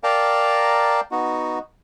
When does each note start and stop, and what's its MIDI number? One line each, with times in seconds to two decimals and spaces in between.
0.03 1.00 70
0.03 1.00 74
0.03 1.00 77
0.03 1.00 79
0.03 1.00 81
0.03 1.00 82
1.11 1.59 59
1.11 1.59 63
1.11 1.59 66